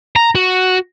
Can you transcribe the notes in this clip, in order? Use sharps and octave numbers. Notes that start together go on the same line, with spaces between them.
A#5
F#4